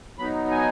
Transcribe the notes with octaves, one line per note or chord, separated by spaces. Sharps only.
F#3 B3 D#4 B5
G#5